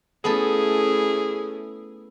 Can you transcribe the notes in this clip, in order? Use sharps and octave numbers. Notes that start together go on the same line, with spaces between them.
A3 B3 C#4 E4 G#4 A4